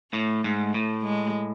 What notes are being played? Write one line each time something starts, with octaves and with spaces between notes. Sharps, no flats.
A2 A3
G#2
A3
A2
G#3